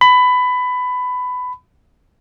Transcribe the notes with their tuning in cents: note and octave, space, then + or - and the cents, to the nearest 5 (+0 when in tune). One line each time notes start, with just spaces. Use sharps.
B5 +20